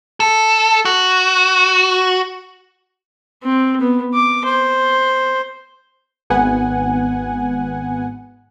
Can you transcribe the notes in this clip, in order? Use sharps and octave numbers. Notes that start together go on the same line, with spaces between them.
A4
F#4
C4
B3
D6
C5
G#1 B3 F#5 G#5